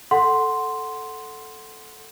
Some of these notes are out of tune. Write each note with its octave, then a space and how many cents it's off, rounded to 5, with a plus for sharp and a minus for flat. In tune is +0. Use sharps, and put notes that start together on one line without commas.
A4 +0 F#5 +0 C6 +0